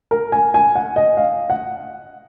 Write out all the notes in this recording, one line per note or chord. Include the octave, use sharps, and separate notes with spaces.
A#4
G#5
G#5
F#5
D#5
F5
F#5